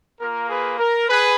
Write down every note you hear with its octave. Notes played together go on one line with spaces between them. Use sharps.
A#3 F4 A#4
G#4 B4
A#4
G#4 B4